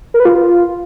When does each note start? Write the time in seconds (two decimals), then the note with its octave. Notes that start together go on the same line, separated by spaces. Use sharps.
0.14 A#4
0.20 B4
0.25 F4